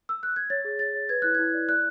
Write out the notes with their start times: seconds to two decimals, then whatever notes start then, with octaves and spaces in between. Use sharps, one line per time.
0.09 E6
0.23 F#6
0.36 G#6
0.50 C#5 A6
0.65 G#4
0.79 C#5 A6
0.94 C#5
1.09 B4 G#6
1.22 E4 F#6
1.35 E4 G#6
1.53 D5
1.69 D5 F#6